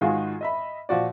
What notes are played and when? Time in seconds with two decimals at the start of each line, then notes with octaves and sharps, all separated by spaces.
0.01 G#2 D#3 G#3 F4 F#4 G#4
0.41 D#5 E5 B5
0.89 A#2 F3 F#4 D5